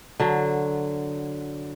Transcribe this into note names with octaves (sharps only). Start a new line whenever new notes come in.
D3 F#3